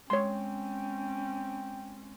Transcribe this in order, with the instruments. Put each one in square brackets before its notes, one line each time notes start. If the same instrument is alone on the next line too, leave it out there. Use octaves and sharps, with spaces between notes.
[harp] G#3 [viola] C4 C#4 [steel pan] C#5 C6 [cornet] G5